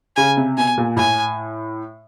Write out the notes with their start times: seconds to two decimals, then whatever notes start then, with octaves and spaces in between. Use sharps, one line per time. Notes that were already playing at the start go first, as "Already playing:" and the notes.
0.16 C#3 G#5
0.37 C3
0.58 B2 G#5
0.78 A#2
0.96 A2 G#5